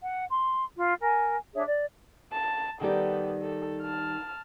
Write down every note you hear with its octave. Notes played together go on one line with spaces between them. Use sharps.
F#5
C6
F4
A#4 G#5
D4 G#4 C#5 E5
D5
A5
D#3 G3 B3 G4 A4
A4
A5 F6